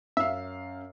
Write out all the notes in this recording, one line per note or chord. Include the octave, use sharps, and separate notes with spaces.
F#2 E5 F5